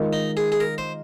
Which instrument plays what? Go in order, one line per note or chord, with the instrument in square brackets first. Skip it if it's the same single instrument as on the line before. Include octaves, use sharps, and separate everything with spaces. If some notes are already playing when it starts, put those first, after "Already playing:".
Already playing: [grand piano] D#3 G#3 F4 A#4 D#5
[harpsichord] D#4
G#4
G#4
A#4
C5